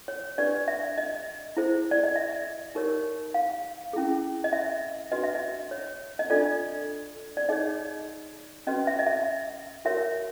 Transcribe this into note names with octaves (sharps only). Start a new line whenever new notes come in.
C#5
D4 G4 B4 D5
E5
D#5
E4 G#4 C5
D5
D#5
E5
D#4 G4 A#4 C#5
F5
C#4 E4 G#4
D#5
E5
D4 F#4 B4 D#5
E5
D#5
C#5
D#5
D4 F4 A4 D5
D5
D#4 G#4 C#5 D#5
C#4 F#4 B4 D#5
E5
D#5
E5
F#4 A#4 C#5 E5